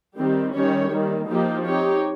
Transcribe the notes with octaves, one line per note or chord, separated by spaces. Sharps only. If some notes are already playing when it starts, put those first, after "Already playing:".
D#3 G3 C4 G4
D#3 G3 C#4 G4 C#5
D#3 G3 A#3
F3 A#3 D#4 G4
C4 D#4 G4 C#5